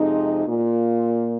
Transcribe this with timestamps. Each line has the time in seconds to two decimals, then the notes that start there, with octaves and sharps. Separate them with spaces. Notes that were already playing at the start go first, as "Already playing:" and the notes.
Already playing: F2 C3 G#3 D#4
0.46 A#2 A#3 F4